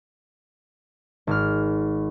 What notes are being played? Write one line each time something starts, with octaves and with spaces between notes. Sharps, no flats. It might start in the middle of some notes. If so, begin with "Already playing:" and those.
G#1 F6